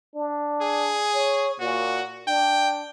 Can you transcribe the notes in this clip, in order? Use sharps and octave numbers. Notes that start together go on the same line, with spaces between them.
D4
G#4
C#5
A#2 F#4
D4 G5